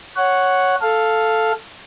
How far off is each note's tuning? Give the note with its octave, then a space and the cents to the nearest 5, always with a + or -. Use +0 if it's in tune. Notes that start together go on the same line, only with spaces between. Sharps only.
C#5 +0 F#5 +0
A4 +0 F5 +0